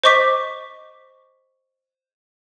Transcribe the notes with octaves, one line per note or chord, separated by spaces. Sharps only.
C5 D#5 C#6 D6 B6